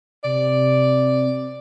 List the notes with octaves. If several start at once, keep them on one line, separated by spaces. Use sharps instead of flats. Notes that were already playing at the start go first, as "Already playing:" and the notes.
C3 D5